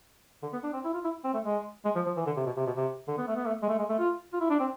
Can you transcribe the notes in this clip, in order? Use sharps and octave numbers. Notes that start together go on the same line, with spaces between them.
D3
B3
D4
C4
E4
F4
E4
C4
A3
G#3
G#3
F3
F3
E3
D3
C3
B2
C3
B2
C3
D3
B3
A3
B3
A3
G#3
A3
G#3
A3
F4
F4
E4
D4
C4